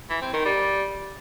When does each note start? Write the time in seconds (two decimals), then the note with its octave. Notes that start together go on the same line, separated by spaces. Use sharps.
0.10 E3
0.22 C4
0.33 D#3
0.45 G3